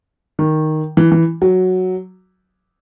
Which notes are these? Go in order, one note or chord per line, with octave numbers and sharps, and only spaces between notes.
D#3
E3
E3
F#3